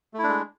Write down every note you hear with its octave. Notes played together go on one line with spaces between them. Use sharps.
G#3 A3 D4 E4